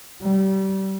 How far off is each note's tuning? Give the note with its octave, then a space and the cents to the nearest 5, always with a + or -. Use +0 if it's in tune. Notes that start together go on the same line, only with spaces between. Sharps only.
G3 -30